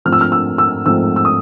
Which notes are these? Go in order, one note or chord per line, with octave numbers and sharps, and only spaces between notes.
G#2 F3 A3 C4 F6
E6
F6
E6
E6
G#2 F3 A3 C4 E6
E6
D#6